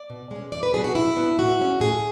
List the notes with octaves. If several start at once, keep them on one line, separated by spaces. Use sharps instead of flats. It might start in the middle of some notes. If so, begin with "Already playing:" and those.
Already playing: D5
B2
G#3 C#4
E2 D5
B4
B2 F#3 B3 D4 G#4
F#4
E2 E4
B2 F#3 B3 D4
A2 F#4
G#3 C#4
A2 G#4